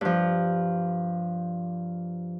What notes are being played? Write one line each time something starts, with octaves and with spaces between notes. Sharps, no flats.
G2 F3